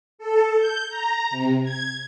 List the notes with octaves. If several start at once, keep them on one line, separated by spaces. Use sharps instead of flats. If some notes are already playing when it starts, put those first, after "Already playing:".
A4
G6
A#5
C3
G#6